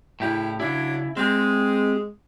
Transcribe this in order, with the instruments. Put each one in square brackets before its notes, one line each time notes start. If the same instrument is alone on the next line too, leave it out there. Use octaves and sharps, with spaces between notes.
[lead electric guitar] A2 G4 [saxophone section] C#3 D4 E4
[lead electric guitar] C#3 E4 [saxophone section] F#3 D4
[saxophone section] G#3 [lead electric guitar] C4 G4